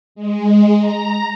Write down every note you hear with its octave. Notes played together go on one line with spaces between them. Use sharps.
G#3
A#5